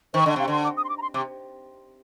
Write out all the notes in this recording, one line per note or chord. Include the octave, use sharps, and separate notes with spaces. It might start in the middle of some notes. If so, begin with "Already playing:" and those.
D#3 C5
D3 D#5
C3 F5
D3 C6
D6
D#6
C6
D6
A#5
C6
C3 D6